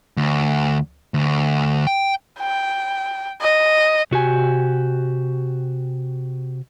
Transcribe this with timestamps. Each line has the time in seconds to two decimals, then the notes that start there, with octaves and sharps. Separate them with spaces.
0.17 D2
1.14 D2
1.87 G5
2.40 G5
3.41 D#5
4.11 C3 F#4 G4 G#5